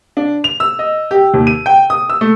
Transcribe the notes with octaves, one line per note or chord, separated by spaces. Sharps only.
D4
F7
E6
D#5
G4
D#2
D#7
G5
D#6
E6
A3